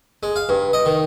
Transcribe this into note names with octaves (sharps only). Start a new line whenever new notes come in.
G#3
F5
G2
D#5
D#3